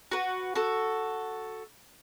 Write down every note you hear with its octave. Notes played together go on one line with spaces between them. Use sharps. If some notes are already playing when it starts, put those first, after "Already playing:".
F#4 B4
F#4 A4